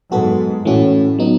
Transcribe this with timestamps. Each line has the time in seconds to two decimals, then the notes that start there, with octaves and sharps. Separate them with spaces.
0.11 G#2 F#3 B3 F#4 A4
0.65 A2 E3 A3 C#4 F#4
1.19 F#3 B3 D#4